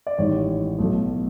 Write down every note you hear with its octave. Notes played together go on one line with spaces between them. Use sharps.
D5
A1 G#2 D#3 G3 C#5
B1 B2 F#3 A3